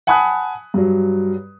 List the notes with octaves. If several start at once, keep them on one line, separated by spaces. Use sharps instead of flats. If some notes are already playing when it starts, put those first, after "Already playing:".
F#5 G#5 A5 B5 D#6 F#6
G2 F#3